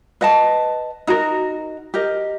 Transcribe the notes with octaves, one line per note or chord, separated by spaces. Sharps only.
B4 D#5 F#5 A5
D#4 F#4 A#4
G4 A#4 D#5